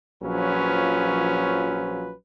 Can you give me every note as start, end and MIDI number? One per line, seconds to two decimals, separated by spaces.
0.23 2.13 34
0.23 2.13 53
0.23 2.13 54
0.23 2.13 61
0.23 2.13 65
0.23 2.13 71